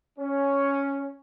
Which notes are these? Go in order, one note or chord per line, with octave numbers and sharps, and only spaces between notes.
C#4